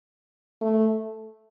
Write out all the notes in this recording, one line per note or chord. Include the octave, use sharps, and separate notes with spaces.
A3